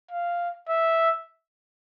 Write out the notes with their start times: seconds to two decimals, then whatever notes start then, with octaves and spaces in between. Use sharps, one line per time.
0.11 F5
0.69 E5